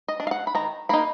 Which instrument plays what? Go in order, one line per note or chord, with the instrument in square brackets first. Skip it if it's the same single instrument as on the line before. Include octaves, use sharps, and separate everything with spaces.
[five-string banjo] D#5
D4
F5
F#5
B5
D#3 A#5
A#3 D#4 B5